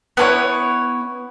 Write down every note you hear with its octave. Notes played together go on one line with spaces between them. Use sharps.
B3 E4 A4 C#5